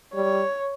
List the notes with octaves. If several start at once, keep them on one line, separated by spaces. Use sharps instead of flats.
G3 C#5